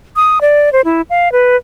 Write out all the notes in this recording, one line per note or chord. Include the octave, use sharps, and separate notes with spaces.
D#6
D5
C5
E4
F5
B4